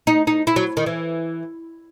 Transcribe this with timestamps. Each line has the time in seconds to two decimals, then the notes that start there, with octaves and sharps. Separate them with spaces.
0.07 D#4
0.27 D#4
0.47 E4
0.56 F#3
0.77 D#3
0.86 E3